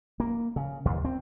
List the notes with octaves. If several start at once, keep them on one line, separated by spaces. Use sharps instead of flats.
A#3
C#3
D#2
C4